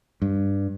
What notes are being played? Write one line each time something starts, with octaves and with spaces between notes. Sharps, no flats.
G2